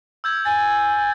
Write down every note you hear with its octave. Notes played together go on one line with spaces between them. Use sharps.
E6 G6 G#6
G#5 A6